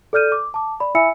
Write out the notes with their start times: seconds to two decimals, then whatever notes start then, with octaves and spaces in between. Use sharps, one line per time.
0.13 A4 D5 F6 G6 D#7
0.32 D6
0.54 A5 D6
0.80 D5 B5
0.95 E4 E5 G#5 B5 E6 C#7